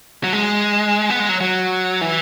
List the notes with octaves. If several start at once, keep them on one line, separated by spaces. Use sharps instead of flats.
F#3
G#3
B3
G#3
F#3
F#3
E3